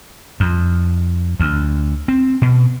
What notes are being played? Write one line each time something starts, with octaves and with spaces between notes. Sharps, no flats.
F2
D2
C4
B2